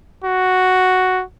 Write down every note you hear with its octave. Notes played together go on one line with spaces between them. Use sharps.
F#4